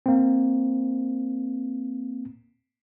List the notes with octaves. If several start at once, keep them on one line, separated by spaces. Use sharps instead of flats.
A#3 C4